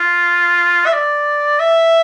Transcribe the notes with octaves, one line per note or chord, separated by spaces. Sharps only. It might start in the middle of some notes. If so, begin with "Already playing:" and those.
Already playing: F4
E5
D5
E5